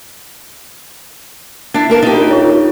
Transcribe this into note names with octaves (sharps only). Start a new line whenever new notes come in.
D4 E4 A6
A#3 A#4 A5
D#4 G4
D4 A#4
F4 C#5